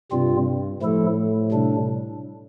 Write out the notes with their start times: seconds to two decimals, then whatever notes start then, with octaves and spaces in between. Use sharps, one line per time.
0.12 G2 C3 G3 C4 F4
0.82 A2 F3 A3 E4 A4
1.52 C3 G3 D4